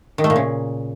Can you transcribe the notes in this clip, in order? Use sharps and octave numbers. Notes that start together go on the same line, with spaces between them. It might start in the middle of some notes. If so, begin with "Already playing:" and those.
D#3
A3
A#2
C#3